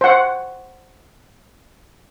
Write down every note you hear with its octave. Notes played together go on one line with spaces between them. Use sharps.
C5 F#5